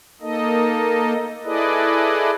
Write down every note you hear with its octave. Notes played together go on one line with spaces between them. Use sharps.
A#3 D#4 A4 D#5
E4 G#4 A4 B4 D5 D#5